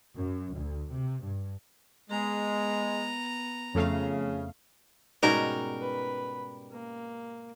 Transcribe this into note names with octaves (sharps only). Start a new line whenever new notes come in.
F#2
D2
C3
G2
G#3 B3 A#5
F2 C#3 A3 F5
G#2 B2 G3 C#4 D#4 F#4 A#4
B4 B5
A#3